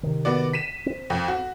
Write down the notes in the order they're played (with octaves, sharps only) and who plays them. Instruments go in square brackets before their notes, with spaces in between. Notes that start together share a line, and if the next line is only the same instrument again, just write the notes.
[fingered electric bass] C3 D#3
[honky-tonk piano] B3 F#4 D5
B6 D#7 E7
[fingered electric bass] C4
[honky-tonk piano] F2
F#4